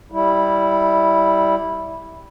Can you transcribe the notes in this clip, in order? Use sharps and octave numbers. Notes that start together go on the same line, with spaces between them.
G3 E4